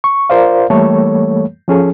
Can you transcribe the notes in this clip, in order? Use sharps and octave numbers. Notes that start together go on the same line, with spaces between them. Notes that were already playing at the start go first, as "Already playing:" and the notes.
C#6
F4 A#4 C5 D5 F5
E3 G3 A3 A#3 A4 C#5
F3 C#4 G#4 A4